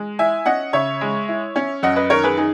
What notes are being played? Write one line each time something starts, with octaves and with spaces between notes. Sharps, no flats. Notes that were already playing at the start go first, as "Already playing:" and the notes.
Already playing: G#3
E4 E5 G#5
C#4 D#5 F#5
C#3 C#5 E5
G#3
E4
C#4
F#2 D#5 F#5
B4 D#5
D#3 A#4 C#5
G#4 B4
D#4 G#4